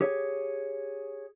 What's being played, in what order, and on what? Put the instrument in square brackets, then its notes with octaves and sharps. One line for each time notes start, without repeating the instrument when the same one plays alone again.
[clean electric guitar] G4 G#4 C#5